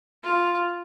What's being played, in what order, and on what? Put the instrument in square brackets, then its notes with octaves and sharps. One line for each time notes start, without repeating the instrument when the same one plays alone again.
[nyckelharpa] F4